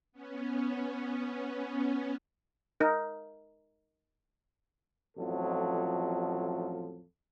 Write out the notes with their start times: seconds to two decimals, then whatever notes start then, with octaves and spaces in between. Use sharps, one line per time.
0.12 B3 C#4
2.80 D#4 A#4
5.18 A1 F2 F3 F#3 A4